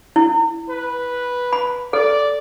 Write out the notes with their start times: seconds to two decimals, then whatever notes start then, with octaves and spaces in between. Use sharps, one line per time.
0.16 E4
0.70 B4
1.53 B5
1.93 A4 D5